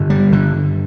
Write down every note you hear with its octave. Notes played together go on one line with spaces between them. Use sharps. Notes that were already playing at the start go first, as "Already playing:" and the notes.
Already playing: G2 D3
G3
D3